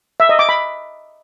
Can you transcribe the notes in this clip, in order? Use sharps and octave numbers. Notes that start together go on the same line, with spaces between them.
E5
D#5
D6
B5